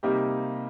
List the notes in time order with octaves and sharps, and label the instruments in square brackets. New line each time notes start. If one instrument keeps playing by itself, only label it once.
[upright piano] C3 G3 A#3 D#4 G4